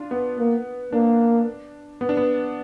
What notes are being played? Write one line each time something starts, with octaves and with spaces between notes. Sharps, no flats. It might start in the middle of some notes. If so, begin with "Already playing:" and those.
Already playing: D4 F4
B3
A#3
A#3 D4
B3
D4
B3